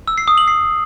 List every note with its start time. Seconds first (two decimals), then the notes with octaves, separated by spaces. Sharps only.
0.08 E6
0.18 C7
0.28 D#6
0.38 F#7
0.48 C7